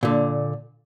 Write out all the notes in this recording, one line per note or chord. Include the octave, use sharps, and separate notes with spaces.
A#2 D3